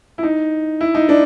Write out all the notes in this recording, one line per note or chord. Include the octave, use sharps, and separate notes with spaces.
E4
D#4
E4
D#4
D4